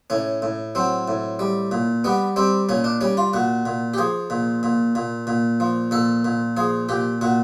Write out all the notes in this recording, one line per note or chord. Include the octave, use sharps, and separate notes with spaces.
A2 C#4
A2
F#3 C4
A2
G3
A#2
G3 B3
G3 C4
A#2 C#4
D4
G3 C#4
F4
A#2 F#4
A#2
G4
F3 G#4
A#2
A#2
A#2
A#2
F3
A#2 A4
A#2
F3 G#4
A#2 G4
A#2 F#4